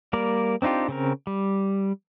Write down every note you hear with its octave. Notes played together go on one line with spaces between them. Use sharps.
G3 A#3 A#4 D5
C4 D4 D#4 F4 G4
C#3 C4 A#4
G3